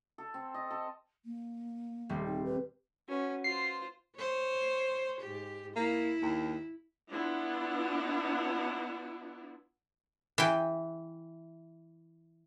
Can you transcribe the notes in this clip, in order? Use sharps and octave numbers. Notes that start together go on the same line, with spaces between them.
A4
C4
D#5
A4
A#3
D#1 G3 C4
D#4
B4
C#4 F#4 B4 F#5
F4 C5 C7
C5 C#5
G#2 G4
A#3 E4
D#2
B3 D4 E4 F4
E3 G5